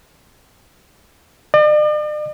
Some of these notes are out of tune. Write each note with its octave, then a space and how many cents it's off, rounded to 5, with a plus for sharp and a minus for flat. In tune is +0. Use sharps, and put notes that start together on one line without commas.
D5 +45